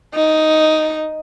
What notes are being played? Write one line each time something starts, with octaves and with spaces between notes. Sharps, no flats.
D#4